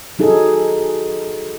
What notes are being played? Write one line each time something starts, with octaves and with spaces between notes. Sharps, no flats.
F#3 D#4 G#4 A4